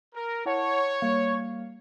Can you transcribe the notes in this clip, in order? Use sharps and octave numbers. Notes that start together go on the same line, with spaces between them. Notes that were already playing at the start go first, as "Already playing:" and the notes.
A#4
E4 C#5 F#5 A5
G3 A#3 F5